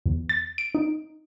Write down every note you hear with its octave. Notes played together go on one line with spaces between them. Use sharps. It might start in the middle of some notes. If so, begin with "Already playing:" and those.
E2
A6
D7
D#4